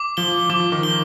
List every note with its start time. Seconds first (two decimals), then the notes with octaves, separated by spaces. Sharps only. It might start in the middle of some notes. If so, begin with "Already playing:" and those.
Already playing: D6
0.17 F3 G7
0.50 F3 D6
0.72 D#3
0.83 G7